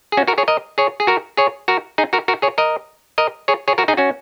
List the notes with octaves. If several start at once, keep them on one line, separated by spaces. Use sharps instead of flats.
G#4
C#4 F#4
F#4 A#4
G#4 C#5
A#4 D#5
G#4 C#5
G#4
F#4 A#4
G#4 C#5
F#4 A#4
D#4 G#4
F#4 A#4
F#4 A#4
G#4 C#5
A#4 D#5
A#4 D#5
G#4 C#5
G#4 C#5
F#4 A#4
D#4 G#4
C#4 F#4